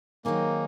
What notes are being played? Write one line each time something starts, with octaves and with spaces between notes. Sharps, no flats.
D#3 F#3 A#3 C4 D#4 G#4